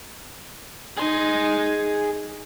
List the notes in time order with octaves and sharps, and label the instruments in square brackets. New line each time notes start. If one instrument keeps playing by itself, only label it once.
[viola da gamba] D#4 [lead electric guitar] G#4 C6